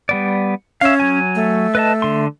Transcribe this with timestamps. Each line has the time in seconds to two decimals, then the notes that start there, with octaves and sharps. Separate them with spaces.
0.09 G3 B3 D5
0.81 C#4 E5 F5
1.00 F#3 G#5
1.35 A3
1.75 B4 D#5 A5
2.02 D3 C6